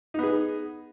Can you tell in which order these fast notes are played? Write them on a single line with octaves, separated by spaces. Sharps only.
D#4 B3 G#4